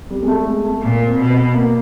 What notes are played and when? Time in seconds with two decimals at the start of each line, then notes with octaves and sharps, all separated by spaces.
0.11 G3
0.23 G#3
0.28 A3
0.46 G#3
0.65 A3
0.82 A#2 A#3
1.07 C4
1.18 B2
1.23 C4
1.30 B3
1.54 A#3